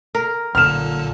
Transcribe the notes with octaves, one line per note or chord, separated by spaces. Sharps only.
A#4
B1 A#2 D3 A5 F6 E7